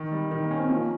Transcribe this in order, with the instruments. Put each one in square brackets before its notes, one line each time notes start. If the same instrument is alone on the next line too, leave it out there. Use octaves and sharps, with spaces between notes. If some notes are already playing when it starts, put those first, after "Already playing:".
Already playing: [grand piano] D#3
G3
D#3
[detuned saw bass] A#3
[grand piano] C#4
[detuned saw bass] C4
[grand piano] F3 [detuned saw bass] A#3